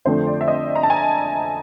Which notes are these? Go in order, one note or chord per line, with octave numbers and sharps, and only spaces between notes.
F2 D3 F3 A3 D4 C5
D5
E5
D#5
A#5
A5
G#5